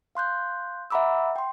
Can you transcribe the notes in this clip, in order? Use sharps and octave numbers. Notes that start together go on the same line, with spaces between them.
F5 C6 F#6 G6
E5 F#5 A#5 B5 D6 E6
G5 C6